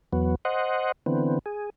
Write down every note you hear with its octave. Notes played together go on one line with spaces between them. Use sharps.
E2 F#3 B3
C5 D#5 F#5
D3 E3 B3 C4
G#4